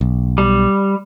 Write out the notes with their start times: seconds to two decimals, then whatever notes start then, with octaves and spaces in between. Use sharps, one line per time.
0.01 B1
0.38 G3